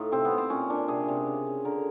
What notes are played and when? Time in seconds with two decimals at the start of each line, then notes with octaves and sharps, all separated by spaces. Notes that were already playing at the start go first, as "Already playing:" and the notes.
Already playing: A2 D#4 F4
0.12 C3 C4
0.25 B3
0.31 C3
0.38 C4
0.50 A#2 C#4
0.70 A#2 D4
0.88 C3 G#4
1.08 C3
1.27 C#3
1.47 C#3
1.65 D3 A#4